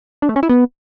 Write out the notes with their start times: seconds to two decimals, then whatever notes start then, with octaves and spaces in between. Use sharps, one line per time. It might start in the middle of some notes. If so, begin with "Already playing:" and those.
0.22 D4
0.29 A3
0.36 C#4
0.43 E4
0.49 B3